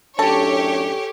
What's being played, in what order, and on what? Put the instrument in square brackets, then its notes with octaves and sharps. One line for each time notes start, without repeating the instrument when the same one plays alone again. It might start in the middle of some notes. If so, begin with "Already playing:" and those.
[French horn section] F#2 A2 D4 [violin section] G4 C#5 [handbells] A4 G#5 [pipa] A5